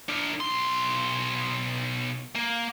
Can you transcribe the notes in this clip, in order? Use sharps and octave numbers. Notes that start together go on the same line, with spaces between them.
D4 A#4
B1 C6
A#3